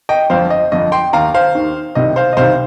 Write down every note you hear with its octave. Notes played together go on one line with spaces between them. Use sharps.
D#5 G5
G1 F2 F3 C5 F5
D#5
G1 F2 F3 D#5
G5 C6
D#2 D#3 F5 A#5
C5 F5
D#2 D#3
C2 C3 D#3 D#5
C5 F5
D#5
C2 C3 D#3 C5 F5